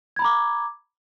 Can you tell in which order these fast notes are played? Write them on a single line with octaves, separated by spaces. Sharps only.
G#6 B5 A#5 D6